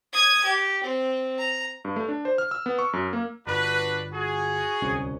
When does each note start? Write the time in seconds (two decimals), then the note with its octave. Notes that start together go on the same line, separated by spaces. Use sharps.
0.13 D#6 G#6
0.44 G4
0.84 C4
1.38 A#5
1.85 G2
1.96 A3
2.09 D4
2.25 C5
2.38 F6
2.51 E6
2.66 B3
2.79 C#6
2.93 F#2
3.13 A#3
3.47 G1 D4 F#4 B4
4.12 F#4 G#4
4.82 D1 C2 C#4